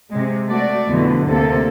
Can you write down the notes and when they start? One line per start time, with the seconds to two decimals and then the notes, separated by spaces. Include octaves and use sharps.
0.10 C3 G#3
0.49 A3 F#4 D5
0.89 F2 B2 D3 E3 A3
1.28 D2 C3 A#3 A4